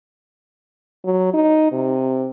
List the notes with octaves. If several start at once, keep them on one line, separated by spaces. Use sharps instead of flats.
F#3
D#4
C3